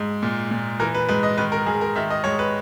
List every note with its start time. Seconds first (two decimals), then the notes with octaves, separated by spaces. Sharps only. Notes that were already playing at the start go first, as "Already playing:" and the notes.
Already playing: G#2
0.23 A#2
0.51 A#2
0.80 E3 A#4
0.95 B4
1.09 G#2 B4
1.23 D#5
1.38 D#3 B4
1.52 A#4
1.66 G#2 G#4
1.81 A#4
1.96 D#3 E5
2.10 D#5
2.24 G#2 C#5
2.39 B4